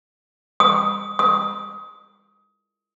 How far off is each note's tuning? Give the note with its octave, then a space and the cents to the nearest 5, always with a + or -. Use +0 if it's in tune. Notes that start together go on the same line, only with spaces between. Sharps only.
D#6 +15
D#6 +25